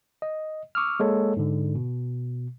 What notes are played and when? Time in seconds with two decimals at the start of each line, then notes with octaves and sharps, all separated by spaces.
0.22 D#5
0.75 C#6 D6 E6 F6
1.00 G#3 A#3 A4 C#5
1.37 G#2 D3
1.75 B2